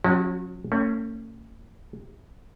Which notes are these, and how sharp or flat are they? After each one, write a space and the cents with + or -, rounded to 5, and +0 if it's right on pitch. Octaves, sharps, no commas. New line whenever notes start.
F#3 -45 C#4 -30 F#4 +15
A3 +45 C#4 +0